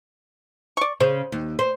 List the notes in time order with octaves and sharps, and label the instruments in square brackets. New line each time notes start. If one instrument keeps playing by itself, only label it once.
[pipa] D5 C#6
[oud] C#3 [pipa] C5
[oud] D#2
C5